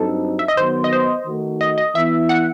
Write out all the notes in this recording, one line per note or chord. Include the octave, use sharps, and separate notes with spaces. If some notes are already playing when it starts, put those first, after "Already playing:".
Already playing: G2 F#3 C4 D#4 A4
E5
D#5
D#3 F#3 B3 C5
D#5
C5
D#3 A3 D#4 F#4
D#5
D#5
E3 B3 E4 E5
F#5